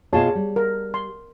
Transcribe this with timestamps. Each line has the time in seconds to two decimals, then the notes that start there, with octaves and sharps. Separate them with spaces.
0.13 B2 F4 G#4 C#5 A5
0.35 G3
0.56 A#4
0.94 C6